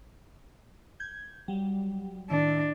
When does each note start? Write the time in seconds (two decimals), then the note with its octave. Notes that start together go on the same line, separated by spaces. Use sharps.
1.00 G6 G#6
1.48 F#3 G3
2.30 A2 D#3 D4 E4